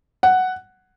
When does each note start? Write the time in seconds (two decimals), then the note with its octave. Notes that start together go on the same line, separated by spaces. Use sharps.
0.23 F#5